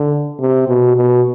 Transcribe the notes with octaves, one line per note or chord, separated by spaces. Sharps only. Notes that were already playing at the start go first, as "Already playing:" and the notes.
Already playing: D3
C3
B2
B2